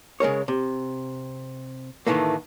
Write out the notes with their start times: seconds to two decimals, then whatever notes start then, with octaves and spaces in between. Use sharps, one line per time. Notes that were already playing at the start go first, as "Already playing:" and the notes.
0.20 C#3 G#3 A#4 C#5
0.48 C3
2.07 A2 D#3 E3 A3 A#3